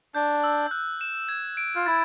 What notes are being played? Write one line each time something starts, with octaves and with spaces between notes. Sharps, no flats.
D4 G6
E6
F#6
E7
G#6
D7
F4
E4 A6